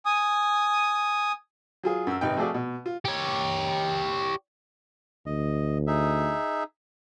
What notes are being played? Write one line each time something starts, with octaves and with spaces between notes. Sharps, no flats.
G#5 D#6
F#3 F4 G#4
F#2 E6
G#1 C3 D#4 B4 G5
F3 A3 F4 F#4 G#4 D5
B2
F4
G4 C#5
D2 D#5
D#4 G#4 E5